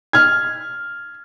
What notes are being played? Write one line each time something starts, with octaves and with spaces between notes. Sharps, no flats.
F6 G#6